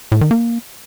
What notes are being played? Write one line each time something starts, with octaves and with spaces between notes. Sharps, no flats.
A2
D#3
A#3